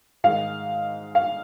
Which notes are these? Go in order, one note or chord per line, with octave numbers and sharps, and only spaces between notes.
G#2 D#3 G#3 F5
F5